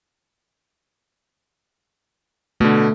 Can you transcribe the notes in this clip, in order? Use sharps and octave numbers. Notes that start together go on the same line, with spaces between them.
B2 D3 A3